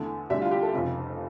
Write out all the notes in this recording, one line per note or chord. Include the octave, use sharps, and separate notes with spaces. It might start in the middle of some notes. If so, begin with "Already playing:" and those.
Already playing: E2 D3 A3
D2 D3 G3 D4 E5
F4
G4
A4
F1 F2 C#3